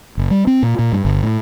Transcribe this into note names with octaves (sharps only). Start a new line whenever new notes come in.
F#1
G3
C4
A#2
A#2
G2
G1
A2